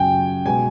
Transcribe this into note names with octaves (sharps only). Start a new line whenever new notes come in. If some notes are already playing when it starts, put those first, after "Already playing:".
Already playing: F#2 C#3 F#3 G5 G#5
B2 G#3 G#5